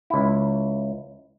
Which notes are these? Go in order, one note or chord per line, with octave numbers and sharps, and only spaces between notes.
C#2 E4